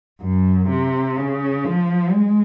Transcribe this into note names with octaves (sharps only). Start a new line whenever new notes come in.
F#2
C3
C#3
F3
G#3